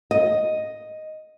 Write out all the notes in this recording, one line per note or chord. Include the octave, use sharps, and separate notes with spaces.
D#5